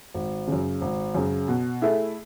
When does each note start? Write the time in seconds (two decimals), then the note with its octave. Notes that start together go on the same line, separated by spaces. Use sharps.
0.14 G#1
0.48 F#2 C#3
0.81 G#1
1.15 F#2 C#3
1.48 B2
1.82 A3 E4 G#4